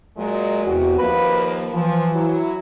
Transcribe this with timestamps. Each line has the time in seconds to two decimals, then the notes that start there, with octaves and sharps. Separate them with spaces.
0.17 A#2 F#3 G#3
0.64 E2 C3 E3 F#4
0.98 D#2 F3 A#3 B4
1.73 E3 F3
2.13 F#3 E4